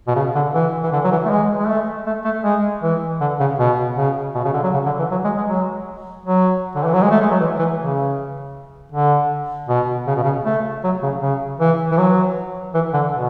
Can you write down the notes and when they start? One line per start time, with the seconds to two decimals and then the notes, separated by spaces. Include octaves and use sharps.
0.08 B2
0.16 C#3
0.35 D3
0.54 E3
0.83 E3
0.93 D3
1.04 F#3
1.12 E3
1.25 A3
1.30 G#3
1.59 G#3
1.68 A3
2.06 A3
2.25 A3
2.44 G#3
2.83 E3
3.21 D3
3.40 C#3
3.59 B2
3.97 C#3
4.35 B2
4.45 C#3
4.54 D3
4.63 F#3
4.74 C#3
4.86 D3
4.99 E3
5.12 F#3
5.25 G#3
5.37 G#3
5.49 F#3
6.26 F#3
6.75 D3
6.84 E3
6.93 F#3
7.02 G#3
7.11 A3
7.21 G#3
7.31 F#3
7.40 E3
7.59 E3
7.78 C#3
8.92 D3
9.69 B2
10.07 C#3
10.16 B2
10.23 C#3
10.45 A3
10.84 F#3
11.03 C#3
11.22 C#3
11.60 E3
11.91 E3
11.98 F#3
12.74 E3
12.94 D3
13.13 B2